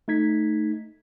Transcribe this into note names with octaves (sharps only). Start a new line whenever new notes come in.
A3 D#4 G#6 B6